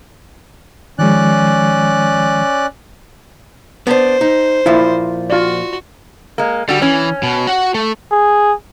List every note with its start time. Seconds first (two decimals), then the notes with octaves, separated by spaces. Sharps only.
0.99 D#3 F3 G#3 C#4 D5 F#6
3.87 B3 D4 C5
4.21 D#4
4.66 A#2 F3 E4
5.30 F4 F#4 D5
6.38 G#3 A#3
6.68 D3 G3 F#4
6.82 E3 C#4
7.23 B2
7.47 F#4 F#5
7.74 A3
8.12 G#4